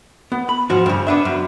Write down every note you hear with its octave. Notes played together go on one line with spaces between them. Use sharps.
B3
B5
G#2 F3 F#4
G2 C#3
B3 D4 E5
F#2